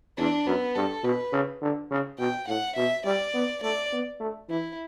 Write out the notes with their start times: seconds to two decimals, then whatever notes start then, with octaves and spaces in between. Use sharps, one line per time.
0.17 E2 D4
0.46 F#2 B3
0.75 G2 A4
1.03 B2 B4
1.32 C#3
1.62 D3
1.91 C#3
2.19 B2 G5
2.48 A2 F#5
2.76 B2 E5
3.05 G3 D5
3.34 B3
3.63 A3 D5
3.92 B3
4.20 A3
4.49 E3 E4